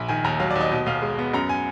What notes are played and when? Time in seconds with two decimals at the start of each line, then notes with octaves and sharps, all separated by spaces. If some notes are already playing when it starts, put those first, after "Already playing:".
Already playing: A#1
0.08 D#3 G#5
0.24 D#2 A#5
0.39 F#3 F5
0.50 D5
0.55 D#2
0.60 D#5
0.71 B2 D#5
0.86 B1 F5
1.02 G#3
1.19 B3
1.34 F#2 A#5
1.49 G#5